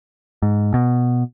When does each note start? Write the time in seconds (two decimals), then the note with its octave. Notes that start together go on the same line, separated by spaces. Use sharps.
0.42 G#2
0.74 B2